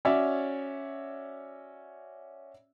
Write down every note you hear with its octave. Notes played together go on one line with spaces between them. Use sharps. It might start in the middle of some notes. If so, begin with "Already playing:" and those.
C#4 F#4 C#5 D5 E5